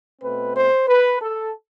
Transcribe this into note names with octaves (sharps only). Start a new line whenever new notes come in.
B2 A3 C4 B4
C5
B4
A4